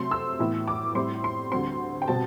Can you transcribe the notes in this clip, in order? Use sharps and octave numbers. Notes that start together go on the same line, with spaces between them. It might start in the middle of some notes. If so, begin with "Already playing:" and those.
Already playing: C3 F#3 A3 C4 C6
E6
A2 E3 B3 E4
D6
A2 G3 C4 E4 C6
C6
D2 D3 G3 C4 C6
G5
B2 G3 C4 A5